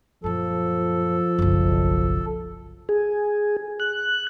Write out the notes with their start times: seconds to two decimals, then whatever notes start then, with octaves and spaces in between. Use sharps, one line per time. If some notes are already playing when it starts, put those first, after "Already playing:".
0.24 F#2 A#2 F3 A4
1.39 F#1 B1
2.89 G#4
3.80 F#6